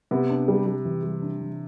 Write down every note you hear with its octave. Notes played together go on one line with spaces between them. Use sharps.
C3 B3
D4
G3
G3
E3
G3
D4
E3